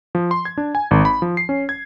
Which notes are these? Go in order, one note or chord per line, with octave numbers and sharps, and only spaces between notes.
F3
C6
G#6
D4
G#5
G#1
B5
F3
C7
C#4
G#6